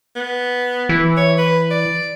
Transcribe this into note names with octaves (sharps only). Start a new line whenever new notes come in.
B3
E3
C#5
B4
D5